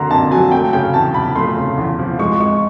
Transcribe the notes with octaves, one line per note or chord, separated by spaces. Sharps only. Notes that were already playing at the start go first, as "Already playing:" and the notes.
Already playing: F2 D3 F#3 A#3 A#5 C6
F2 A5
F#3 G#5
A3 G5
C#3 G5
E2 A5
F3 B5
A3 C6
C#3
E2
F3
G#3 C#6
G#3 C#6